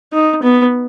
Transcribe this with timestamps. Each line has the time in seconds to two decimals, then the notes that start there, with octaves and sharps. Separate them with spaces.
0.13 D#4
0.43 B3